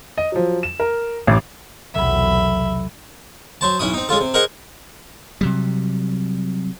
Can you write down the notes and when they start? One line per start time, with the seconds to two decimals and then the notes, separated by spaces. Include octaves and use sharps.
0.18 D#5
0.32 F3 F#3
0.63 E7
0.80 A#4
1.27 A1 D6
1.94 B1 E2 C3 F#3 A3 E5 B5
3.61 F#3 C5 A5
3.79 B1 C#4 E4 D#6
3.94 C4 D#4
4.09 G#3 C#4 F4 A4
4.21 C3
4.34 G#4 A#4 C5 D#5 F#5 G#5
5.41 C3 F#3 G3